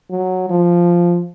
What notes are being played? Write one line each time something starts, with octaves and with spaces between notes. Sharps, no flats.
F#3
F3